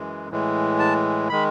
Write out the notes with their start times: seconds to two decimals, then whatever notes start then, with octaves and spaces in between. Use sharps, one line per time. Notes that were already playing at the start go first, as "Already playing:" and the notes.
Already playing: F#2 E3 G#3
0.30 A2 E3 G#3
0.79 A5
1.29 D#3 G#3 B5